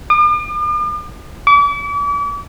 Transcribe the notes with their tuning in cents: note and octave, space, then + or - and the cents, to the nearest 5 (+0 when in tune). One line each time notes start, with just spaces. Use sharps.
D6 +45
D6 -40